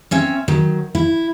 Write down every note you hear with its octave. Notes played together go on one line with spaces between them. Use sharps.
C4 C#4 E5
D#3 F#3
E4